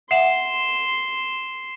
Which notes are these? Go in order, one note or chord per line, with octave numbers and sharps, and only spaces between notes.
E5 F#5 C6 C7 E7